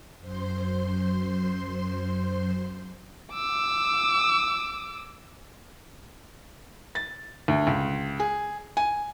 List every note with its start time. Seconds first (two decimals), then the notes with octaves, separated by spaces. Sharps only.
0.19 F#2 C5 C6
3.34 D6 E6
6.95 A6
7.48 D2
7.67 C#2
8.20 G#4
8.77 G#5